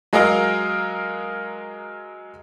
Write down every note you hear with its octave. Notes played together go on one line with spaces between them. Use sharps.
F#3 G#3 G#4 A#4 D#5 F5